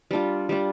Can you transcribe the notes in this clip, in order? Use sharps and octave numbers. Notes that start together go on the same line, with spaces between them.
G3 D4 F4
G3 D4 F4